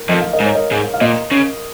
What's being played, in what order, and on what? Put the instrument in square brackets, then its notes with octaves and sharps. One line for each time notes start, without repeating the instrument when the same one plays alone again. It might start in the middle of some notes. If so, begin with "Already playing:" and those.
Already playing: [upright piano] A#4
[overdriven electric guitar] F2 [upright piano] D#5
[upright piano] F5
A#4 D#5
[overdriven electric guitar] G#2
[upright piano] C#5
A#4 D#5
[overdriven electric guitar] G#2
[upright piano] F5
[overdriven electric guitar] A#2 [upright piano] A#4 D#5
[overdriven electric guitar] C#3